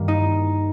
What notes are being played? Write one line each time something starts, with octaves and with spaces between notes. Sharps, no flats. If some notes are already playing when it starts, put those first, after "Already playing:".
Already playing: G2 D#3 A#3
D#4